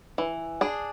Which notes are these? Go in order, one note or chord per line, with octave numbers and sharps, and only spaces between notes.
E3
D4 G#4